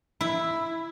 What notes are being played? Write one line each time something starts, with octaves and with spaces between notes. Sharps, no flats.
E4